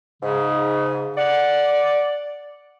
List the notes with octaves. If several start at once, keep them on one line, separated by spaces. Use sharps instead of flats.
G#2 C#3
D5 F#5